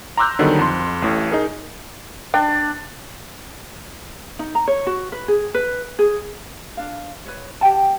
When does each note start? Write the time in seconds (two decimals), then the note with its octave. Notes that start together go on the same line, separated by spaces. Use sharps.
0.17 A#5 C6 D6 E6 F#6 G6
0.39 D3 D#3 F#3 G3 B3 D#4
0.59 F2 C6
1.02 A1 A2
1.31 D#4 G#4 A#4
2.34 D4 G5
4.39 D#4
4.55 A#5
4.68 C#5
4.87 F#4
5.12 B4
5.28 G#4
5.54 B4
5.99 G#4
6.77 D4 F5
7.26 B4 C#5
7.61 G4 F#5 G5 A5